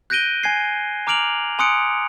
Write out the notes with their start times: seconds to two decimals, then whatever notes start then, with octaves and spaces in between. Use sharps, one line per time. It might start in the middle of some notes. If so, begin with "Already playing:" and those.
0.10 F#6 G6 A#6 D7 D#7 G7
0.43 G#5 G#6 C7
1.07 A#5 D6 F6 D7 F7 F#7
1.59 G#5 C6 D#6 F#6 C#7 D7